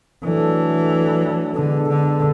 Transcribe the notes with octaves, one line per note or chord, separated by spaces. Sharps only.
E3 F#3 A3 D4 A4
D3 G#3 B3 D4 A4
D3